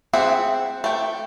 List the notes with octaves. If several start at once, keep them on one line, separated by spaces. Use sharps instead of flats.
C4 G#4 E5 F#5
A3 G5